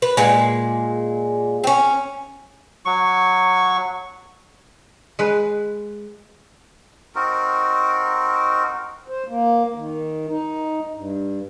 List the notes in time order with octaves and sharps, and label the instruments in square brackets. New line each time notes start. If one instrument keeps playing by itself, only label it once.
[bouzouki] B4
A#2 G#3
C4 C#4
[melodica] F#3 C#6
[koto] G#3 B4
[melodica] C4 D#4 F#4 A#4
[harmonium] C5
A#3
D#3
D#4
G2